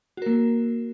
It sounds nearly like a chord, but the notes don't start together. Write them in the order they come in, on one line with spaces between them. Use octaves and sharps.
F#4 A#4 A#3